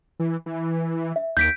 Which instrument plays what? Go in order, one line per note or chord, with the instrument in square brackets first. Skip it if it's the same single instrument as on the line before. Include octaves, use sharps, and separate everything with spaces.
[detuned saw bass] E3
E3
[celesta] E5
[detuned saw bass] D#2 [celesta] G6 B6 D7